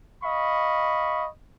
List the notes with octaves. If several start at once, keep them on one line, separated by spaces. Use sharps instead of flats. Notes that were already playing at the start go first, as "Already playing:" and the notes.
D#5 F5 B5 C#6